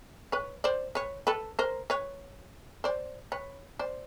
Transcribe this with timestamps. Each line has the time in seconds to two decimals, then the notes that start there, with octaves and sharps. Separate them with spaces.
0.32 B4 C#5
0.64 C5 D5
0.95 B4 C#5
1.27 A4 B4
1.59 A#4 C5
1.90 B4 C#5
2.84 C5 D5
3.32 B4 C#5
3.79 C5 D5